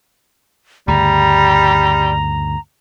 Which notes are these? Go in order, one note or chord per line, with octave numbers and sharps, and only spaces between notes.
D2 G2 C#3 G3 A#5